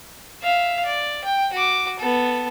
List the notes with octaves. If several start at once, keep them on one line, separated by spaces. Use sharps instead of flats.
E5 F5
D5
G5
F#4 D6
B3 A4